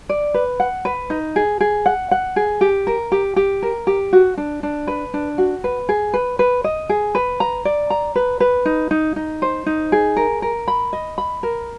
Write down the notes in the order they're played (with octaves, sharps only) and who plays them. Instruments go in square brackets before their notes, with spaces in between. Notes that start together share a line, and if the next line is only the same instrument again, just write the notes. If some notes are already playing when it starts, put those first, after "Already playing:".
[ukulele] D5
B4
F#5
B4
D#4
G#4
G#4
F#5
F#5
G#4
G4
A#4
G4
G4
A#4
G4
F#4
D4
D4
B4
D4
F#4
B4
G#4
B4
B4
D#5
G#4
B4
A#5
D5
A#5
B4
B4
D#4
D#4
D#4
C5
D#4
G#4
A#4
A#4
B5
D#5
B5
A#4